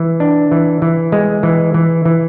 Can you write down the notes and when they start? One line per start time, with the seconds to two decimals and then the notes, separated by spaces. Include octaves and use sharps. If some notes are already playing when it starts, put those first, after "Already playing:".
Already playing: E3
0.20 D4
0.52 E3
0.82 E3
1.12 G#3
1.43 E3
1.74 E3
2.05 E3